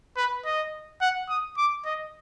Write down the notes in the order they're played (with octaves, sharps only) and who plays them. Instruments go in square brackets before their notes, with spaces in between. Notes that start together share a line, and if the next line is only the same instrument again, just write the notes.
[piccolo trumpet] B4
D#5
F#5
D#6
D6
D#5